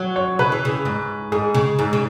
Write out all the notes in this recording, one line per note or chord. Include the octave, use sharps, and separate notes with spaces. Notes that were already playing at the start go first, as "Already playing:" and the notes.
Already playing: F#3 C#5
C#5
C#3 B4
E3
C#3
G#2
G#2 G#4
C#3
G#2
C#3